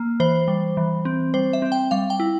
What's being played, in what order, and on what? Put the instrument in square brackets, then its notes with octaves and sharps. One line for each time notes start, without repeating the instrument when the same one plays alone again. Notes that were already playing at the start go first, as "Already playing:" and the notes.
Already playing: [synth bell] A#3
E3 C5
G3
E3
C4
G3 C5
E5
C4
G5
G3 F5
G5
E4